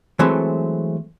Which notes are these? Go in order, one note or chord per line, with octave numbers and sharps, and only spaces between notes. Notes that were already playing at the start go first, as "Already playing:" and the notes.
E3 F#3 G#3 A3 C4